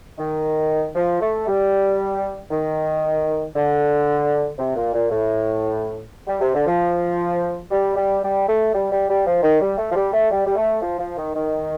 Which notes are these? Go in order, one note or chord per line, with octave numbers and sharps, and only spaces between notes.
D#3
F3
A3
G3
D#3
D3
C3
A#2
A#2
A2
G3
C3
D3
F3
G3
G3
G3
A3
G3
G3
G3
F3
D#3
G3
A3
F3
G3
A3
G3
G3
A3
F3
F3
D#3
D#3